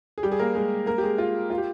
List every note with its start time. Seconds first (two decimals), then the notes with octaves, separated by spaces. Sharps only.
0.18 G#4
0.23 G3 G4
0.32 G#4
0.39 A#3 A#4
0.55 G#3 G#4
0.86 A#3 A#4
0.98 G4
1.03 G#3 G#4
1.18 F4
1.50 F4
1.58 G4